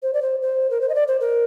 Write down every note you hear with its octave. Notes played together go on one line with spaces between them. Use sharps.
C5
D5
C5
C5
A#4
C5
D#5
D5
C5
A#4